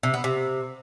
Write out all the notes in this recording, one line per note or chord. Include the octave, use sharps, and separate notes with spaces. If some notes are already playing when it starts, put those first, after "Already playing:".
C3
B3
C3